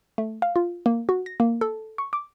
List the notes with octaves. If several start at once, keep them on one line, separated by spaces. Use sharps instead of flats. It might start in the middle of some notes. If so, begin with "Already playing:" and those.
A3
F5
F4
A#3
F#4
A#6
A#3
A4
C#6
D6